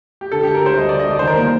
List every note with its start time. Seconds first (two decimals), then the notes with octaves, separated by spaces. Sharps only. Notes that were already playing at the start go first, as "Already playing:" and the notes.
0.21 G4
0.32 D3 A4
0.43 D2 G4
0.55 A#4
0.62 D2 C5
0.77 G3 D#5
0.89 D3 D5
0.99 D#5
1.07 G3 D5
1.19 C5
1.22 D#3 A#4
1.36 A#3 C5